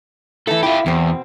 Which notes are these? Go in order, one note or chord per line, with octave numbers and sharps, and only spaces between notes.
E3 A3 A4
E4 F4 G4
E2 B2 C4